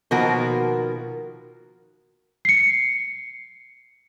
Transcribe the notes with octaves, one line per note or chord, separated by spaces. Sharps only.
B2 D#3 F3 A#3 F#4 A#4
C7 C#7